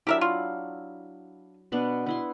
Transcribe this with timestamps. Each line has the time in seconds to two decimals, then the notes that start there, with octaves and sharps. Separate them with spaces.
0.07 F#3 D4 E4 G4 A#4 E5
0.21 F4
1.72 B2 B3 D4
2.06 B3 E4 C6